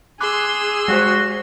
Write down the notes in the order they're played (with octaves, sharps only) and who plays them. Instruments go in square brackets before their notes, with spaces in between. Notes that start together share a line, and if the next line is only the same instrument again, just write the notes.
[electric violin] G#4 [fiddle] C6 E6 [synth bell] D6 F#6
[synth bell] G#3 G4 C5 [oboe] F#4